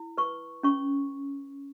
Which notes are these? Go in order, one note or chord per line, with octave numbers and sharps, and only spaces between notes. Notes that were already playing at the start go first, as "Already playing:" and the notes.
Already playing: E4
B4 C#6
C#4 C#6